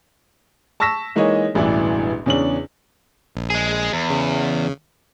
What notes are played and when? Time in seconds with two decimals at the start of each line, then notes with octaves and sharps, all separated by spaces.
0.80 A5 C#6 E6 A#6 B6 E7
1.16 E3 G#3 A#3 D#4 C#5 D#5
1.55 E1 A1 G2 E3 D4 E4
2.26 E2 C#3 C#4 D4 F#7
3.35 A#1
3.50 G#3 G#4
3.93 E2
4.10 C#3